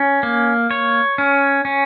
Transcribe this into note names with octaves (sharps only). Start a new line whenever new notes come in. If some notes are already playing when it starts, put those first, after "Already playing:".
Already playing: C#4
A#3
C#5
C#4
C#4